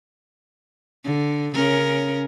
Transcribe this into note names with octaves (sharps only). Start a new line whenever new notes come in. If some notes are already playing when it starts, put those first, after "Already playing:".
D3
C#3 C#4 A#4